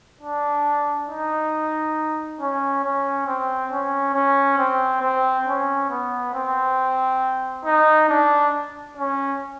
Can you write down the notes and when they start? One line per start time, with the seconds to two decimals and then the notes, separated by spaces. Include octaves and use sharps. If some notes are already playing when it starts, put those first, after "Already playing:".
0.21 D4
1.09 D#4
2.41 C#4
2.84 C#4
3.27 C4
3.72 C#4
4.15 C#4
4.58 C4
5.03 C4
5.47 C#4
5.90 B3
6.34 C4
7.65 D#4
8.09 D4
8.97 C#4